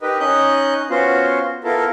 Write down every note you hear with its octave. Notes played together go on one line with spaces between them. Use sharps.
D#4 G4 A#4 B4 D#5
C#4 D#4 D#5 F#6 G6
B3 C#4 F4 F#4 C5
B3 E4 F4 A4 A#4